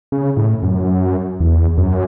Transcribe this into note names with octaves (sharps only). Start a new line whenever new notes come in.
C#3
A2
F#2
E2
F#2